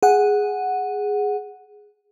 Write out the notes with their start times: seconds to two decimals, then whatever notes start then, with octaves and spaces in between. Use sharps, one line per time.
0.03 G#4 F#5